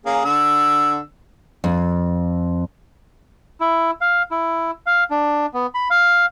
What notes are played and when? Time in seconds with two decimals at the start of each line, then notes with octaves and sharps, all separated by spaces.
0.06 A#3 C#4 G#4
0.25 D3 E6
1.64 F2
3.60 E4
4.01 F5
4.31 E4
4.86 F5
5.11 D4
5.54 B3
5.74 B5
5.90 F5